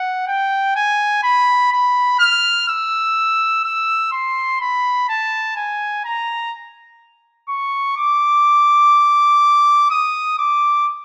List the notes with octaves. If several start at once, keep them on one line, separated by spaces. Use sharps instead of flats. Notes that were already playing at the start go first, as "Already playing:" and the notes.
Already playing: F#5
G5
G#5
B5
B5
F6
E6
E6
C6
B5
A5
G#5
A#5
C#6
D6
D#6
D6